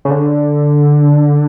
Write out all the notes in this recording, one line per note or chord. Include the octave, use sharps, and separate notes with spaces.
C#3
D3